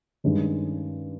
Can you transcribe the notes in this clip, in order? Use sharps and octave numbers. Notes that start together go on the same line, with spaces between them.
G2 D#3 G#3 C#4